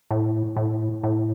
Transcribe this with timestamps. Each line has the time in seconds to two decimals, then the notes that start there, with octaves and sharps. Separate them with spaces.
0.11 A2
0.56 A2
1.03 A2